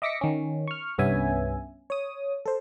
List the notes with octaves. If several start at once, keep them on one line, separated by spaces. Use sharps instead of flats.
D#5 E5 D6 A#6 B6 C#7
D#3 C#4
C#6 F6
C2 G2 B3 C#4 E5 G#5
C#5 D#6
A4 C5